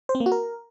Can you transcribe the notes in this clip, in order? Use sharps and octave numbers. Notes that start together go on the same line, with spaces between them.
C5
C4
A#3
F#4
A#4